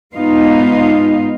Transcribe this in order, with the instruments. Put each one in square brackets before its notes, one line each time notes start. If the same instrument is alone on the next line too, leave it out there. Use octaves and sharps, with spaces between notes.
[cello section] G#2 B3 D#4 F4 F5